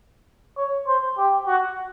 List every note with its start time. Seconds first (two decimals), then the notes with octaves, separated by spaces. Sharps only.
0.57 C#5
0.87 C5
1.17 G4
1.47 F#4